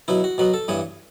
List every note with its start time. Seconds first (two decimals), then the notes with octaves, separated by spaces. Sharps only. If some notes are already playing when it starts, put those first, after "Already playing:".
0.08 B2 F#3 B3 E4
0.24 F#4
0.38 B2 F#3 B3 F#4
0.54 A4
0.68 G2 E3 B3 C#5